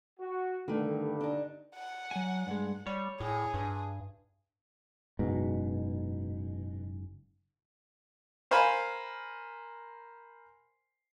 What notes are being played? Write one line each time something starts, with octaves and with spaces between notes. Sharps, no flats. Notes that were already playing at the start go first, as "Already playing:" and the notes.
F#4
G2 D3 D#3 A3
D4 D#4
F#5
F#3 G#5
G2 G#3
G3 C#5
A2 G#4
G2
F#1 G#2 B2
A#4 C5 F5 G#5 B5